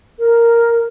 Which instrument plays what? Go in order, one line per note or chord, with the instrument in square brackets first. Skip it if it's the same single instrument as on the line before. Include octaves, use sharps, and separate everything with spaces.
[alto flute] A#4